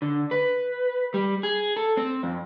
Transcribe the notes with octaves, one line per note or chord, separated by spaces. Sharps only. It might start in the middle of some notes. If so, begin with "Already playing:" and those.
D3
B4
G3
G#4
A4
C4
F2